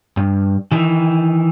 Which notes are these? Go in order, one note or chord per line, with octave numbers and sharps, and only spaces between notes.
G2
D#3 E3